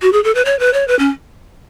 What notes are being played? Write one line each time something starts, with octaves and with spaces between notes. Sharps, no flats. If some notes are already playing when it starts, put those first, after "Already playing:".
F#4
G#4
A4
B4
C#5
B4
C#5
B4
C#4